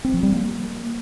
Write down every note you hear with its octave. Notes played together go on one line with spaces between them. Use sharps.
C4
F3
G3
A#3